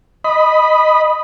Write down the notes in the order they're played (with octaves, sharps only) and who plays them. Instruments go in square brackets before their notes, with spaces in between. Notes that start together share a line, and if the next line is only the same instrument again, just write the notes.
[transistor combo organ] D#5 B5